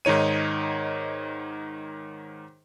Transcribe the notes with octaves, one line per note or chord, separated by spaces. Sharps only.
G#2 D#3 D#4 C#5 D#7